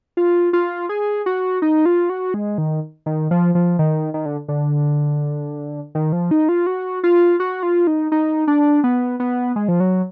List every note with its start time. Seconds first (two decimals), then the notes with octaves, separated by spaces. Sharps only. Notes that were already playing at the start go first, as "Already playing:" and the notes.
0.17 F4
0.53 F4
0.89 G#4
1.26 F#4
1.62 D#4
1.86 F4
2.10 F#4
2.34 G#3
2.58 D#3
3.06 D#3
3.31 F3
3.55 F3
3.79 D#3
4.14 D#3
4.26 D3
4.48 D3
5.95 D#3
6.12 F3
6.31 D#4
6.49 F4
6.67 F#4
7.04 F4
7.40 F#4
7.63 F4
7.87 D#4
8.12 D#4
8.47 D4
8.84 B3
9.20 B3
9.56 G#3
9.68 F3
9.80 F#3